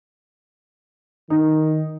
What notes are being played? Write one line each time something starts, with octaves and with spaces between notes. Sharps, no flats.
D#3 D#4